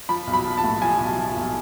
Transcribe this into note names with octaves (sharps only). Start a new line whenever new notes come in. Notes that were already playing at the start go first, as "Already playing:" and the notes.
F3 B5
B1
B5
F3
A5
A2
F3 G#5
B1
F3
B1